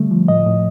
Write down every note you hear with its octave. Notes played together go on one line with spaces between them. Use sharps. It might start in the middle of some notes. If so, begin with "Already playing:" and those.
Already playing: D3 G3 A3
F3
A2 D#5
A2